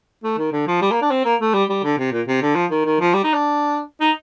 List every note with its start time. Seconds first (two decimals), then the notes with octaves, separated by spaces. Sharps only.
0.24 A3
0.38 D#3
0.52 D3
0.67 F3
0.82 G3
0.91 A#3
1.02 D4
1.11 C4
1.25 A#3
1.40 A3
1.54 G3
1.69 G3
1.84 D3
1.98 C3
2.12 A#2
2.27 C3
2.42 D3
2.55 F3
2.70 D#3
2.85 D#3
3.00 F3
3.14 G3
3.24 D#4
3.34 D4
4.01 D#4